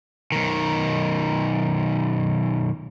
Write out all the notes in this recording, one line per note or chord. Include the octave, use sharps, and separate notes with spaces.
B1 D#3